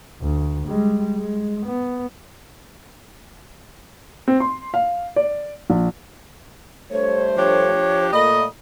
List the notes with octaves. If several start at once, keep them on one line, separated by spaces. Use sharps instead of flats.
D2
G3 G#3
G#3
B3
C4
C6
F5
D5
A#1
G2 A3 C5 C#5
F3 D4 G4 C#5
A#2 A3 D#5 B5